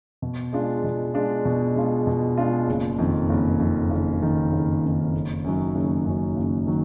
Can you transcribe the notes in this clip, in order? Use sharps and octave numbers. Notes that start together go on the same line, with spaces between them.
B2
G#3 D4 F4
B2
G#3 D4 F4
B2
G#3 D4 F4
B2
G#3 D4 F4
F#1
F2 D#3
F#1
F2 D#3
F#1
F2 D#3
F#1
F2 D#3
F#1
F#2 D#3 F#3
F#1
F#2 D#3 F#3
F#1
D#3 F#3